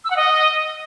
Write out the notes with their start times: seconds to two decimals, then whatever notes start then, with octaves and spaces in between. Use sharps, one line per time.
0.04 E6
0.10 F#5
0.16 D#5